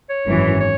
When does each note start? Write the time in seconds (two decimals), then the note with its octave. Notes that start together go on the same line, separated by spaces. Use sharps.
0.10 C#5
0.26 G#1 F#2 E3
0.60 C#5